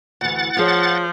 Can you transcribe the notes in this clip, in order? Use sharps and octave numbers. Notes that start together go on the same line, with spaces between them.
D2 E3 F#5 A6
F3 F4 G#4 C#5